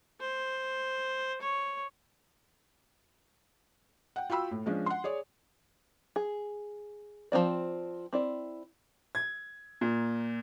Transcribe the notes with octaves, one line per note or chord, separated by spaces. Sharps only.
C5
C#5
F#5 G5
F4 F#4 G5 B5 E6
A2
F3 G#3 C#4 D4
F#5 C6
G#4 C#5 D5
G#4
F3 A#3 C4 D5
C4 E4 D5
G#6
A#2